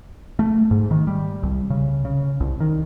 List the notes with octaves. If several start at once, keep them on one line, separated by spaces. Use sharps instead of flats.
A3
G#2
D#3
G3
C2
C#3
C#3
C2
D#3